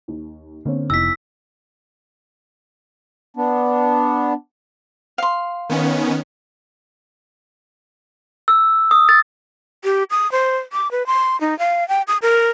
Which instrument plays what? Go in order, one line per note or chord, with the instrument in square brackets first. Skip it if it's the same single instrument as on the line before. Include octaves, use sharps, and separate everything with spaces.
[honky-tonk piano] D#2
[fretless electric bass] D3 [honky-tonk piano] A#3 C4 C#4
[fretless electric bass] F1 [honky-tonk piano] E2 D#4 A#6 [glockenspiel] E6 B6
[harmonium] B3 D4
[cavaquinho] F5 C6
[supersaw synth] D#3 B3 C#4
[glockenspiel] E6
D#6
A6
[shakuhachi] G4
D#6
C5
D6
B4
C6
D#4
F5
G5
D#6
A#4